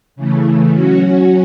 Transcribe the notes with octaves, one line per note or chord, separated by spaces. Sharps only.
C#3 E3 A3
F#3 C#4 F#4